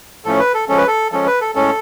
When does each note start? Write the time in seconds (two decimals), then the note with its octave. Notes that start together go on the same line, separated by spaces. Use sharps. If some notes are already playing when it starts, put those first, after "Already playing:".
0.25 A2 F3 A3 C#4 A4
0.39 B4
0.54 A4
0.68 F3 G#3 C#4 A4
0.77 B4
0.87 A4
1.12 F3 G#3 C#4 A4
1.26 B4
1.41 A4
1.55 A2 G#3 C#4 A4